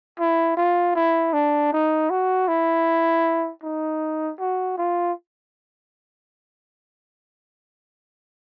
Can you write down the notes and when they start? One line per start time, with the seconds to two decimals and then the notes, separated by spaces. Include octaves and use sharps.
0.19 E4
0.57 F4
0.95 E4
1.33 D4
1.73 D#4
2.10 F#4
2.48 E4
3.63 D#4
4.39 F#4
4.78 F4